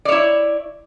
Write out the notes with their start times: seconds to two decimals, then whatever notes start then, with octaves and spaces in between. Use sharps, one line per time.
0.05 D5
0.09 C#5
0.12 E4